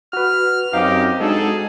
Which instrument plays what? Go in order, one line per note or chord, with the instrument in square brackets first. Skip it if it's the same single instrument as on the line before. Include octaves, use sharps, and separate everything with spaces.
[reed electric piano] F#4 B4 [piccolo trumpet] F6
[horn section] F#2 C4 D#4 [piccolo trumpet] G4 [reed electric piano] F5 D6
[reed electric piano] G#3 D4 [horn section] D#4 F#4 A4 [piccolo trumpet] G#4